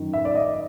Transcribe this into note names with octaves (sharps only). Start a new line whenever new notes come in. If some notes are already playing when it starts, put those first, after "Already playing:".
Already playing: F#2 D#3
E5
D5
D#5